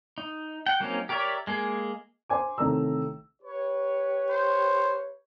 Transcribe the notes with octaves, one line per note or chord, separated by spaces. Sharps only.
D#4
F#5 G5
F#3 A#3 C4 C#4 D#4
G4 A#4 C#5 D5 E5
G#3 A#3 G#4
C5 G#5 D6
A1 C3 D#3 A3 A#5 E6
G4 B4 C#5
C5